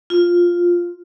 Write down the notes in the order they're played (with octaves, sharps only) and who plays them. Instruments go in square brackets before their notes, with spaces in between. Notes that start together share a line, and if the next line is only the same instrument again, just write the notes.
[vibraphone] F4